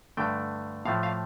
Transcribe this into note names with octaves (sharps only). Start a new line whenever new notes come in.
G2 D3 A3 G5
A2 F3 A3 F5
F5